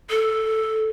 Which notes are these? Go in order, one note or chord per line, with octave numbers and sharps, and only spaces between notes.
A4